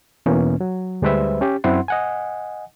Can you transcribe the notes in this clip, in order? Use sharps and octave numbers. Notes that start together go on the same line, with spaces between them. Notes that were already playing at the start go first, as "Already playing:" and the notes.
E2 B2 E3 A#3 C#4
F#3
D2 G3 G#3 B4 C5 E5
C#4 G4
F#2 C4 E4 F#5 C6
D#5 F#5 G#5